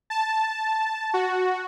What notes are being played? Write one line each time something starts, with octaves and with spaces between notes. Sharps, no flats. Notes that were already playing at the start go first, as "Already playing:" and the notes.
A5
F#4